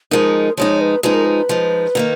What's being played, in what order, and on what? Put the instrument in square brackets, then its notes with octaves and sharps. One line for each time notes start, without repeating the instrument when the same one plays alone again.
[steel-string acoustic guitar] F3 G#3 D#4 [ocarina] A#4
[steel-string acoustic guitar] F3 G#3 D#4 [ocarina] C#5
[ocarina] B4
[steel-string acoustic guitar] F3 G#3 D#4 [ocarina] B4
[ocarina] A#4
B4
[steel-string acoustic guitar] F3 G#3 D#4
D#3 A#3 D#4